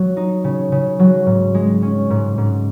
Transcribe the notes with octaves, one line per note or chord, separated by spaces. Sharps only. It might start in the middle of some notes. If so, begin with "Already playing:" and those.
Already playing: F#3
D#4
C#3
C#3
F#3
G#2
G#3
C#4
G#2
G#2